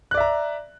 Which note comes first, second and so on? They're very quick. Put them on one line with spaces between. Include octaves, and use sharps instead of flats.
F#6 D5 E5 A#5